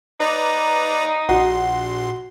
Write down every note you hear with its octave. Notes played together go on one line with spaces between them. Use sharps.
D#4 B4 D5 A#5
A#1 F#4 C6